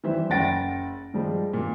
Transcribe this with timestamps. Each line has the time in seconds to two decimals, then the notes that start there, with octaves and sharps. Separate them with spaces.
0.04 E3 G3 C5 E5
0.30 F#1 F#5 G5 A6 A#6 D7
1.14 G2 F3 G3 G#3
1.53 G2 A#2